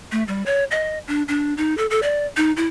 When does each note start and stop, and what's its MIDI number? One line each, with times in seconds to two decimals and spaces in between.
0.12 0.23 57
0.28 0.44 55
0.46 0.64 73
0.71 0.98 75
1.08 1.23 62
1.28 1.54 62
1.57 1.76 63
1.77 1.86 69
1.90 2.00 69
2.03 2.26 74
2.37 2.52 63
2.57 2.67 64